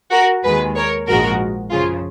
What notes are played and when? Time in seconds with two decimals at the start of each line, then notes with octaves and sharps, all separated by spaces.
0.12 F#4 A#4
0.44 D#2 D#3 G#3 G#4 B4
0.76 A#4 C#5
1.08 A#1 G#2 F3 G#3 F#4 A#4
1.72 F#2 C#3 F3 F4 G#4